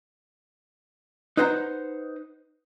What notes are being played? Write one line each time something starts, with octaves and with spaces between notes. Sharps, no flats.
D#4 B4 C5 F#5 A#5